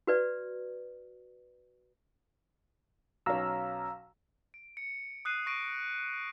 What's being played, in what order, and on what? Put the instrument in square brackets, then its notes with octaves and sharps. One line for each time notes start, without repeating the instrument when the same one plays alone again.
[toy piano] F#4 B4 D5
[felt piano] B1 C#4 [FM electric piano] F5 A#5 E6
[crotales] D7
C#7
D#6 F#6 C7 D#7
C#6 A#6 D7 D#7